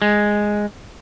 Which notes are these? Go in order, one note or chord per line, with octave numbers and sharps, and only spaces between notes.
G#3